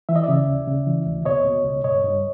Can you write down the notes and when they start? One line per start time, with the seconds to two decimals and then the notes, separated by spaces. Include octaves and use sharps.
0.09 E3 E5
0.16 D#5
0.23 D5 E5
0.28 C#3
0.48 D2
0.67 C#3
0.87 E3
1.06 D2
1.25 B2 C#5 D#5
1.45 B2
1.64 C#2
1.84 G2 C#5 D#5
2.04 G2